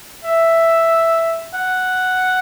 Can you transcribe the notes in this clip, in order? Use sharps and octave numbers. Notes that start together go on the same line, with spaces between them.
E5
F#5